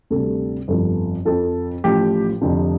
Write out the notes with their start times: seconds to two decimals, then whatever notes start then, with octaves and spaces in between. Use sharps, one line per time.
0.10 D2 C3 G3 A4
0.68 G1 F2 F3 A4
1.25 F2 F3 A4
1.84 A1 A2 F3 G4
2.42 F1 F2 D3 F3